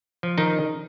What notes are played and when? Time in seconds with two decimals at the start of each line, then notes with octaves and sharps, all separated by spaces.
0.23 F3
0.38 D#3 D#4